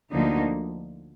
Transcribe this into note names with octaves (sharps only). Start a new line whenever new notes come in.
D2 D3 F3 A#3 D#4